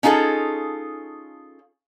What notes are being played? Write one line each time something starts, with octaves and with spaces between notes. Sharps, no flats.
C#4 D#4 F4 G#4 A4